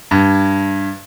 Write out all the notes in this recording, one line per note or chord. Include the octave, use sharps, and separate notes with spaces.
G2